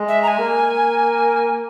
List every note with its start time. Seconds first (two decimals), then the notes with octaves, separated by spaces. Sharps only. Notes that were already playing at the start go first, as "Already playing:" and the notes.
Already playing: G#3
0.08 E5
0.23 A#5
0.28 G#5
0.38 A#3